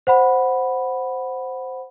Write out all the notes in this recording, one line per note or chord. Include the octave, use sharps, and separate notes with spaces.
C5 F#5 B5